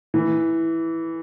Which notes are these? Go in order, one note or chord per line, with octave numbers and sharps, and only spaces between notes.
E3